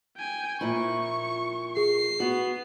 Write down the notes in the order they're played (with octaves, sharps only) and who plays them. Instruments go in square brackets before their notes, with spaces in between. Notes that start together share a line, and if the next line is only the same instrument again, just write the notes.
[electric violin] G5 G#5
[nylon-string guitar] A#2 F3 E4 [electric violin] C#6
[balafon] G#4 [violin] C7
[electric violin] B3 [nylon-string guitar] F#4